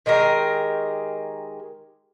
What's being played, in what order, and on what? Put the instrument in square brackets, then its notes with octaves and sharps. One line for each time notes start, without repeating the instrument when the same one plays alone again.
[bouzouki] D#3 G#3 G4 A#4